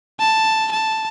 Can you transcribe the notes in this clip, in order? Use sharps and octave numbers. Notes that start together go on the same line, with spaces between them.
A5
A5